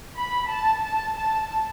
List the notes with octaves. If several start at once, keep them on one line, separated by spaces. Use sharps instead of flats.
B5
A5
A5
A5